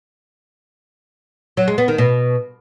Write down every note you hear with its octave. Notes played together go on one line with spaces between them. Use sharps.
F#3
G#3
B3
D#3
B2